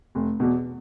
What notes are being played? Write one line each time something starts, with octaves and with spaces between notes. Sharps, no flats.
F1
E2 B2